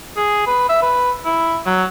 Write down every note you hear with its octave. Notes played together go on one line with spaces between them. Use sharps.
G#4
B4
E5
B4
E4
F#3